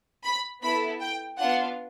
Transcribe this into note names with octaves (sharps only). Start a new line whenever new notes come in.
B5
B3 E4 A4 B5
G5
B3 D4 F4 F#5